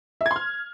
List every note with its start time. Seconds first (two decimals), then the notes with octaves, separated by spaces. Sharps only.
0.21 E5
0.26 G#6
0.31 C6
0.36 F6